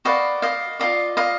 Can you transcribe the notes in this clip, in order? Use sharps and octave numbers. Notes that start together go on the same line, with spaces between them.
F#4 B4 D5 D#5 F5
D#5 F5
F4 A#4 D5 D#5 F5
D#5 F5